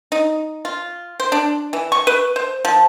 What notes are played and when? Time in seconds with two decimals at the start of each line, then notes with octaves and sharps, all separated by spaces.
0.12 D#4
0.65 F4
1.20 C5
1.32 D4
1.73 E3
1.92 C#6
2.07 B4
2.36 C5
2.65 F3